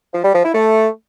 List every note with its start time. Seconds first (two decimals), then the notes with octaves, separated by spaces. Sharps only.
0.14 F3
0.24 G3
0.34 F3
0.44 E4
0.54 A3